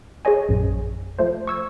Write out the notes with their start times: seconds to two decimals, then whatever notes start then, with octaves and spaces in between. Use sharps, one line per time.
0.25 G#4 C5 C#5 D#5 G#5
0.49 A#1 F#2
1.19 F3 A3 C5
1.47 C#6 E6 G#6